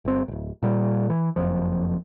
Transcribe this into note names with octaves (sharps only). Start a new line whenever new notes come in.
G1 C4
D1 G#1
A#2 G3
E3
F#1 B1 F2 F3